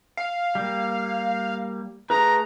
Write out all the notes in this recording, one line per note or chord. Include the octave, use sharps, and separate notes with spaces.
F5
G3 A#3
A3 G#4 B4 A#5